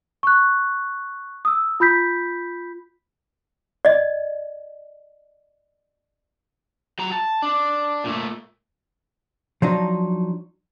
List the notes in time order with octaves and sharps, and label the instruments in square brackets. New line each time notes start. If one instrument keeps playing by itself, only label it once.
[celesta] C#6 F#6
D#6 E6
F4 B5 G6 B6
[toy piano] D5 D#5
[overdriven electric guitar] F#3 A#5
A5
D4
A#2 A3
[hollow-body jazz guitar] F3 F#3 D4 D#4